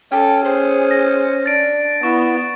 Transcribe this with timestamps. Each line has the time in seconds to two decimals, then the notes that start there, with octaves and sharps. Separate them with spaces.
0.12 C#4 A4 G5
0.44 G#4 C5
0.91 A#6
1.46 D4 A6 D7
2.03 B3 E4 C#6